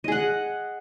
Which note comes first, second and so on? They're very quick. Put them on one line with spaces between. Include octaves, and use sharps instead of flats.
D#5 G#4 F#5